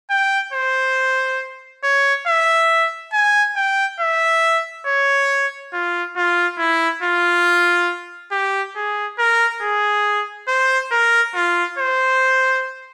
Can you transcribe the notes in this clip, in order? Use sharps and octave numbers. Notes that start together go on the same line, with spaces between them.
G5
C5
C#5
E5
G#5
G5
E5
C#5
F4
F4
E4
F4
G4
G#4
A#4
G#4
C5
A#4
F4
C5